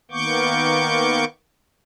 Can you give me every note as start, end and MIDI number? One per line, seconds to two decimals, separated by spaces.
0.11 1.25 51
0.11 1.25 58
0.11 1.25 59
0.11 1.25 85
0.11 1.25 86
0.11 1.25 91